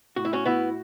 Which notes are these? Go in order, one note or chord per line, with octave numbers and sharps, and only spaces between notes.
A2 F#4
E4
C#4 F#4
B3 E4 F#4